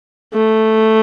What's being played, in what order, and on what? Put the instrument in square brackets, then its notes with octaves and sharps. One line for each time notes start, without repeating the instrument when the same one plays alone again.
[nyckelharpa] A3